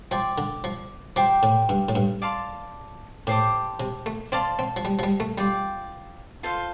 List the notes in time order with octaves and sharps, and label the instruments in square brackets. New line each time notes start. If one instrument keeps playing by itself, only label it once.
[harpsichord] F3 [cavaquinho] D5 G5 C6
[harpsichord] D3
F3
[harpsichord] F3 [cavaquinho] G4 C5 G5 D6
[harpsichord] A2
G2
A2
G2
[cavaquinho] D5 F5 A5 C6
[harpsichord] A2 [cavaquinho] G4 C5 A5 D6
[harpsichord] C3
A3
[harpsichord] C4 [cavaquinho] D5 F5 A5 C6
[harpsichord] C4
F3
G3
F3
G3
A3
[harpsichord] G3 [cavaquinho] F4 D5 G5
[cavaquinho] F4 A4 C5 F5